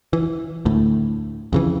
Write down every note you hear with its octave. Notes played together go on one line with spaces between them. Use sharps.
E3
D2 A2
F2 C#3 E3